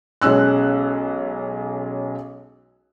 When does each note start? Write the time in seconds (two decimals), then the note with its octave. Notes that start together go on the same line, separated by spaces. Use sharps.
0.22 B1 G#3 C#4 E6 F#6